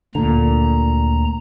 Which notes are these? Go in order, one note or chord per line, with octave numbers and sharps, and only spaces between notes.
D2 A#2 D3 A#5